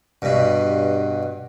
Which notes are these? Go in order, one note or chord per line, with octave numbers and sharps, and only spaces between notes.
G2 B2